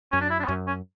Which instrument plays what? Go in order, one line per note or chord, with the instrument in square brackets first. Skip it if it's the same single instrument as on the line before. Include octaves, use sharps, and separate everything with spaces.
[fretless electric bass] F#2 [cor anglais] C#4
[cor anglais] D4
E4
D4
B3
[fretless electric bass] F#2 [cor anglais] C#4
[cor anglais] C#4